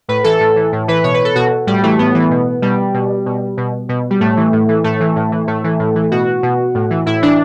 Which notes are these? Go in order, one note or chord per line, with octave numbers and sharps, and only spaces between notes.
A2 B4
E3 A4
A2
E3
A2
E3 B4
B2 C#5
B4
A4
B2 F#4
A2 G3
E3 A3
A2 B3
E3
B2
B2 G3
B2
B2
B2
B2
G3
A2 A3
E3
A2
E3
A2 A3
E3
A2
E3
A2 A3
E3
A2
E3
B2 F#4
B2
A2
E3
A2 E4
E3 D4